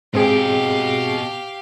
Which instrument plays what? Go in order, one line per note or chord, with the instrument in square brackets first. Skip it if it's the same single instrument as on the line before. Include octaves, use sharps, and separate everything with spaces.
[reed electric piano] G#2 C4 G#4 [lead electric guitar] B2 G5 [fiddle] G4 F5